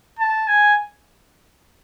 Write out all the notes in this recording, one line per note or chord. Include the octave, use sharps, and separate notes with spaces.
A5
G#5